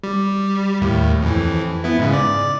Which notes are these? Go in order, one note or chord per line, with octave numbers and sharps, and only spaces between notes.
G3
D#2 A2
F2 E3
B3 E4
G#2 C#3
D5